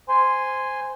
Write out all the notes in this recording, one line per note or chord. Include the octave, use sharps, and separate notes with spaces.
C5 G#5 C6